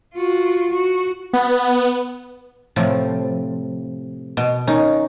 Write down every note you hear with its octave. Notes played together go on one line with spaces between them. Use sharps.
F4 F#4
F#4
B3
A2 C3 F3
B2
D#3 C#4 D#4